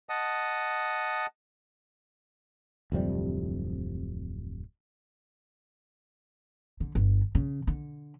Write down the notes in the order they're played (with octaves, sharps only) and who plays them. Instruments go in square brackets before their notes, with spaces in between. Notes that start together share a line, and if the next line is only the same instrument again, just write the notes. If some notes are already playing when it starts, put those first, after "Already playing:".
[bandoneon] D#5 F#5 A5 D#6
[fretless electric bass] D1 F2 C3 G3
[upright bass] D3
G1
C#3
D3